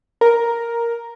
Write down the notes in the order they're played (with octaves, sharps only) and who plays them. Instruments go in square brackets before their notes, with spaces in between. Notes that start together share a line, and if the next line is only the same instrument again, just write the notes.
[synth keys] A#4